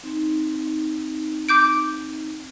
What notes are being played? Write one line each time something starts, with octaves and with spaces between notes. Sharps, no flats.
C4 D#4
D6 G6 D7